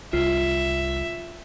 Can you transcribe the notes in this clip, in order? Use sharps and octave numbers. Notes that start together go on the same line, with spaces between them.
C2 F4 E5